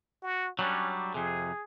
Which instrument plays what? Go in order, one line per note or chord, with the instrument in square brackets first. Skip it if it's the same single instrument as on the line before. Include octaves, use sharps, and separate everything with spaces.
[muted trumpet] F#4
[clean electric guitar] F#3 G3 D4 [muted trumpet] C#4
[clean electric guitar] F2 C3 [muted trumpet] G#4